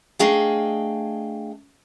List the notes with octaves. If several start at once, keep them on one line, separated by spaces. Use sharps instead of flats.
A3 D4 G#4 D#5 F5 G5